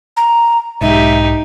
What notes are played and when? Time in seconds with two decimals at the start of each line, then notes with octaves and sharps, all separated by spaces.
0.17 A#5
0.81 B1 G#2 D#4 G4 E5